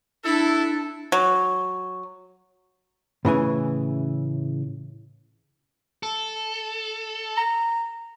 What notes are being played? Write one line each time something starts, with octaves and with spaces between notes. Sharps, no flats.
D4 E4 A4
F#3
A2 C#3 E3 G#5
A4
A#5